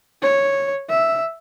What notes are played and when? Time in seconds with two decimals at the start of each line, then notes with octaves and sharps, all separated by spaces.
0.23 C#5
0.90 E5